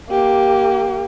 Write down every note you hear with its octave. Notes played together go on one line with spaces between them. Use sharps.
A#3 G4